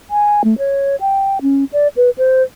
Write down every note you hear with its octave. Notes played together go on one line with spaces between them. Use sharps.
G#5
A3
C#5
G5
C#4
D5
B4
C5